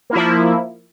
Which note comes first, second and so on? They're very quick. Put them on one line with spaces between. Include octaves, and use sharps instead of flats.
A#3 E4 F3